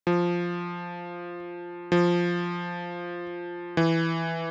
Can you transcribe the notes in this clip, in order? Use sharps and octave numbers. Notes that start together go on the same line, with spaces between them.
F3
F3
E3